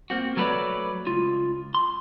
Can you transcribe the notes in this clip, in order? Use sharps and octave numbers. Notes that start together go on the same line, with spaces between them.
A#3 C4 F#4
F#3 A3 A#4 B4 C#5 D5
C#2 F4
C6